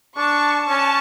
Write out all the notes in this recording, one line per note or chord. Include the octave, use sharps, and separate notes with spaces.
D4 A5 C#6
C#4 A5 C#6